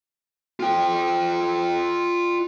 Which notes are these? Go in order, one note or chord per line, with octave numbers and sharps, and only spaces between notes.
F4 G5